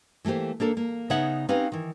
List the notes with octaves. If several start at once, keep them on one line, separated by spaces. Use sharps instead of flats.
E3 A3 A#3 G4 C5
A#3 D4 A4 A#4
A#3
C#3 B3 D#4 C#5 E5 F#5
C4 C#4 D#4 G4 B4 F5
D#3 E3